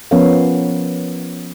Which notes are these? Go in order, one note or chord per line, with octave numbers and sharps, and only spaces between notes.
F3 B3 C#4 A#4 C#5 F5